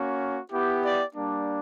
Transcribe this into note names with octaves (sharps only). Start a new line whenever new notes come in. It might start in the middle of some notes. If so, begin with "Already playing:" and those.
Already playing: A#3 C#4 F#4
B3 E4 G4
D5
G3 A#3 D4